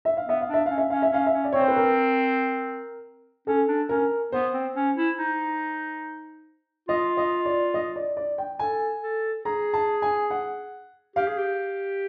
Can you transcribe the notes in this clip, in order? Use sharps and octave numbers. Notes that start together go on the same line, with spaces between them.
E5
F5
B3 E5
F5
D4
E5
C#4 F5
E5
C#4 F5
E5
C#4 F5
E5
C#4
D5
C4 C#5
C5
B4
A#4
C#4 A4
D4
C#4 A#4
B3 C5
C4
C#4
E4
D#4
F4 D#5
D#5
D5
D#5
D5
D5
G5
A4 G#5
A4
G#4 A#5
A5
G#5
F#5
G4 F5
G#4
G4